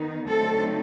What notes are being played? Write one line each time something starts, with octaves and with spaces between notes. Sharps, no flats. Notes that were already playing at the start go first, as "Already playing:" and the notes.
Already playing: D#3 B3 D#4
D3 F#3 A3 C4 D#4 A4